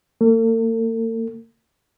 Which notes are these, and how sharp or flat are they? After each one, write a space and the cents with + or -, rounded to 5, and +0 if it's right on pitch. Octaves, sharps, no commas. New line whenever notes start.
A#3 -40 A4 +45